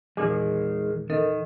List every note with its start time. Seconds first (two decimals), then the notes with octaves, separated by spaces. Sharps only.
0.17 E2 A#2 D#3 E3 G#3
1.10 D#3 A4 A#4 D#5